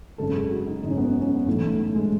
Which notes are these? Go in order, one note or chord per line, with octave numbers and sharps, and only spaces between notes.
G#1 F#2 C#3 A4
G#4
F#4
D#4
G#1 F#2 C#3 D#4
C#4
B3
C#4
C#4
B3
B1 A2 E3 A3
A3
A3
G#3